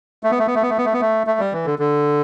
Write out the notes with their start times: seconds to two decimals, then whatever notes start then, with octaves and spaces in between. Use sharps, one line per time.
0.23 A3
0.31 B3
0.39 A3
0.47 B3
0.55 A3
0.63 B3
0.70 A3
0.78 B3
0.86 A3
0.93 B3
1.01 A3
1.27 A3
1.40 G3
1.53 E3
1.66 D3
1.79 D3